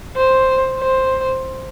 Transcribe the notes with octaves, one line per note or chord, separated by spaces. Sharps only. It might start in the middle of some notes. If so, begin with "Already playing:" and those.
C5
C5